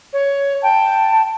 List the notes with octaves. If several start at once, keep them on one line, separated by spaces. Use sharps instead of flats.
C#5
G5 A5